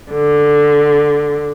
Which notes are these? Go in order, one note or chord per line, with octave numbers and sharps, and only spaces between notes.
D3